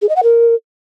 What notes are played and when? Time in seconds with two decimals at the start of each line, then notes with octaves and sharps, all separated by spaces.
0.02 G#4
0.09 D#5
0.16 F#5
0.23 A#4